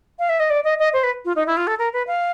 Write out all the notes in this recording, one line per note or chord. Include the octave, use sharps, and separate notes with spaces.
F5
E5
D#5
D5
D#5
D#5
C5
B4
F4
D#4
E4
F4
A4
A#4
B4
F5